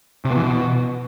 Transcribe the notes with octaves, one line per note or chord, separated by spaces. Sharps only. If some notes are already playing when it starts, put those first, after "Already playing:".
C3
B3
E3
B2